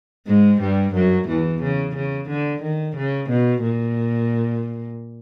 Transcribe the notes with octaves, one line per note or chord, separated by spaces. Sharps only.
G#2 G#3
G2 G3
F#2 F#3
E2 E3
C#3
C#3
D3
D#3
C#3
B2
A#2